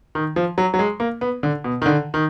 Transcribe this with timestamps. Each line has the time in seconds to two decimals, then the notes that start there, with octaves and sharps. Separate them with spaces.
0.15 D#3
0.36 F3
0.58 F#3
0.74 F#3
0.79 G#3
1.00 A#3
1.21 B3
1.43 D3
1.64 B2
1.82 D#3
1.86 D3
2.14 D#3